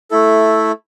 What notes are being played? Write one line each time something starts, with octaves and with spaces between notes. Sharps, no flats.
A3 E4 A4